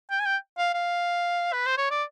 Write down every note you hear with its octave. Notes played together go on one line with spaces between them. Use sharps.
G5
G#5
G5
F5
F5
B4
C5
C#5
D5